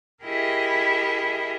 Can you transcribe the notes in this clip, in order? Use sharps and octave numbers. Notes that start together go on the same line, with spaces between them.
E4 G4 G#4 A#4 D#5 E5